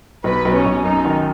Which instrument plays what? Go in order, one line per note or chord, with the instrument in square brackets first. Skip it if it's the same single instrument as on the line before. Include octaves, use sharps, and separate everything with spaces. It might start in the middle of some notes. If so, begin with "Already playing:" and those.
[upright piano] B1 [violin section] B4
[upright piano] B1
[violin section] C#4
[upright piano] B1
[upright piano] F#2 [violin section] D#4
[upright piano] D#3